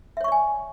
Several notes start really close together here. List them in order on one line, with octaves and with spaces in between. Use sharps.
E5 C#5 C#6 D5 G#5